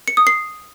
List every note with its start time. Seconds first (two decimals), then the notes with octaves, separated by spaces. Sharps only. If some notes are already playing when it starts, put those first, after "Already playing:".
0.08 C#7
0.17 D#6
0.27 C7